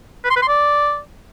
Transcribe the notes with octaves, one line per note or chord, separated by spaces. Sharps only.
B4
C6
B4
C6
D5